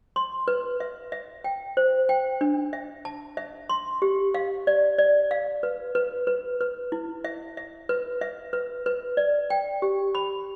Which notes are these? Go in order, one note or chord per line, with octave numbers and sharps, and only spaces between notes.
C6
B4
E5
E5
G5
C5
G5
D4
E5
A5
E5
C6
G4
F5
D5
D5
F5
B4
B4
B4
B4
E4
E5
E5
B4
E5
B4
B4
D5
G5
G4
B5